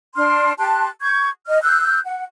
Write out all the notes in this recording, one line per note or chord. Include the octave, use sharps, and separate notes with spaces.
D4 C6 F6
G4 A5 C6 F#6
C#6 G6 G#6
D#5 F6
E6 F#6 G6
F#5